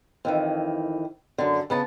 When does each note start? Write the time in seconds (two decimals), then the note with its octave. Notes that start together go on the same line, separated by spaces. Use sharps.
0.25 F2 D#3 E3
1.38 F#2 D3
1.70 C#3 B3 A5